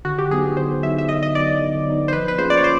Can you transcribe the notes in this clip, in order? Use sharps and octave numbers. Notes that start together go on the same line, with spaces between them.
D3 F#4
G4
F#3 B3 D#4 G#4
D3 C5
F#3 B3 D#4 E5
E5
D3 D#5
D#5
F#3 B3 D#4 D5
D3
F#3 B3 D#4
C5
F3 B4
B4
A#3 C#4 F4 G#4 C5
D5
C#5
C5